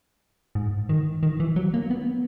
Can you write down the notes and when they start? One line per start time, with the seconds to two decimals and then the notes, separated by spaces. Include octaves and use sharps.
0.55 G#2
0.89 D#3
1.23 D#3
1.40 E3
1.56 F#3
1.74 A#3
1.90 B3